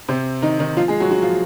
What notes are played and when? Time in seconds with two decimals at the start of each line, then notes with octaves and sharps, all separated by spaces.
0.08 C3 C4
0.42 D#3 D#4
0.59 D#3 D#4
0.77 F3 F4
0.88 G#3 G#4
1.00 F#3 F#4
1.11 F#3 F#4
1.23 F3 F4